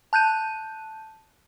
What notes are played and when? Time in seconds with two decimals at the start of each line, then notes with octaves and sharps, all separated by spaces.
0.13 A5 F#6 G6 D#7